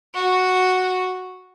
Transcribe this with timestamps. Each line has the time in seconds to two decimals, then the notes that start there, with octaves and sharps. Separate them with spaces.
0.15 F#4